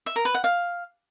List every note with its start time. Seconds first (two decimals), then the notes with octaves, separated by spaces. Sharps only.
0.06 E5
0.16 A#4
0.25 B4
0.35 F#5
0.44 F5